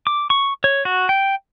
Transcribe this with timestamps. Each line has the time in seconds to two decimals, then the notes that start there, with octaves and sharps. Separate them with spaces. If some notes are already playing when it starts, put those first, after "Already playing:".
0.07 D6
0.30 C#6
0.64 C#5
0.85 F#4
1.09 G5